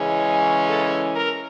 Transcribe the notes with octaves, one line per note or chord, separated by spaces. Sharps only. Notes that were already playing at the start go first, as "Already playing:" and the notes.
Already playing: C#3 E3 G#3 C#4
A4
A#4